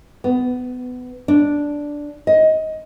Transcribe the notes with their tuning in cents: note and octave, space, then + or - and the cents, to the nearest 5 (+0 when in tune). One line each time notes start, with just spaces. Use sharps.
B3 +20
D4 -5
D#5 +20